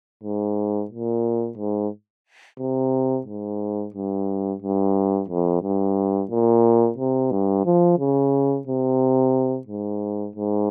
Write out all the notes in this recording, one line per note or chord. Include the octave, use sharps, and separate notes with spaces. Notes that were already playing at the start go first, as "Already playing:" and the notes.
G#2
A#2
G#2
C3
G#2
G2
G2
F2
G2
A#2
C3
G2
F3
C#3
C3
G#2
G#2